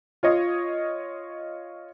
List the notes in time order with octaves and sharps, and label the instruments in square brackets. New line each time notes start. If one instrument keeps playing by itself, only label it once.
[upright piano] F4 C#5 D#5